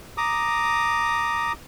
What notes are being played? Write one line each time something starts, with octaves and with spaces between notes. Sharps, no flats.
A#5 D6 D#6